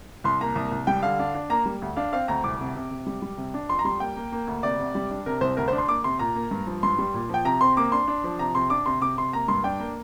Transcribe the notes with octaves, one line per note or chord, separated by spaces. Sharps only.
C2 C6
A#3 A#5
C2
C2
G3 G5
D3 F5
D4
D4
A#3 A#5
G3
D2
D4 F5
C4 F5
D2 A#5
C2 D6
C3
C3
C3
G3
G3
C3
D4
F2 C6
A#5
G3 C6
A#3 G5
A#3
A#3
D2
C3 D5
C3
G3
D4
C3 A#4
C2 C5
D2 A#4
C5
D4
C6
A#3 D6
C3 C6
A#2 A#5
A#3
G2
F3
G2 C6
G3
A#2
F3 G5
C3 A#5
C4 C6
A#3 D6
D4 C6
D4
F3
C3 A#5
C3 C6
D4 D6
C3 C6
C3 D6
C3 C6
A#3 A#5
G2 C6
D4 G5
A#3